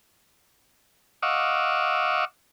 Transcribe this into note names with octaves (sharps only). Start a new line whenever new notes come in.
D#5 F5 F#5 C#6 D6 E6